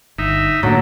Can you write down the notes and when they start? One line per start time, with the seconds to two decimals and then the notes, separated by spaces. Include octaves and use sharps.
0.18 G1 D#4 E5
0.63 A2 D3 F#3 A#3